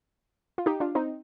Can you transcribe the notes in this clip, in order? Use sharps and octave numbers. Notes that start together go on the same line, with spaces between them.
F4
D#4 G4
D4 F4
C4 D#4